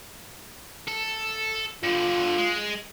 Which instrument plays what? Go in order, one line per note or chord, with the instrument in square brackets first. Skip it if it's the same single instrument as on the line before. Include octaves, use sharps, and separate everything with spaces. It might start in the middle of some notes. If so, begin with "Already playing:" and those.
[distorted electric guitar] A4
[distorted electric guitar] G2 D3 [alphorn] F4
[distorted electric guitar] G#3